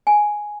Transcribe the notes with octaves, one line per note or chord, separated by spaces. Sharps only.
G#5